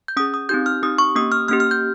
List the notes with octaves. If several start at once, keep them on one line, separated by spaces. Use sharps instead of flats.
G6
C#4 G#4 D#6
D#6
C4 D#4 G4 G6
F6
C4 D#4 G4 D#6
C#6
A#3 C#4 G4 D#6
F6
A#3 C#4 G4 F6
F6
G6